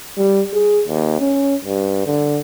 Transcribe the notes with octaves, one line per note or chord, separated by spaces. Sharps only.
G3
G#4
D#2
C#4
G2
D3